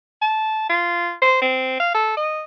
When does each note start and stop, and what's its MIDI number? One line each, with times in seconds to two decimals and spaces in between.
0.22 0.68 81
0.69 1.13 65
1.22 1.40 72
1.42 1.78 60
1.80 1.93 77
1.94 2.16 69
2.17 2.44 75